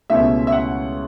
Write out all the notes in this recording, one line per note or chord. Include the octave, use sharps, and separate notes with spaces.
C#2 B2 A3 C#4 E4 E5
E5
F#5